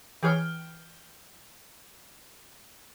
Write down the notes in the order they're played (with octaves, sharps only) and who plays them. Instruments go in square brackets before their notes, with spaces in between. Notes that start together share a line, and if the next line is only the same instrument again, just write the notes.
[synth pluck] E3 G#4 C#5 [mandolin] G5 F6